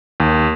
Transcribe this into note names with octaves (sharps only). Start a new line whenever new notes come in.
D#2